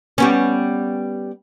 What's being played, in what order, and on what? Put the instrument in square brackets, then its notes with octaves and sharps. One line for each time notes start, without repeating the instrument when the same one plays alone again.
[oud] G3 B3 C#4